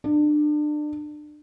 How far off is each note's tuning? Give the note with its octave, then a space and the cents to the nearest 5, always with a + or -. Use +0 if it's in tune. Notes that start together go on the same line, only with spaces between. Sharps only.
D4 +30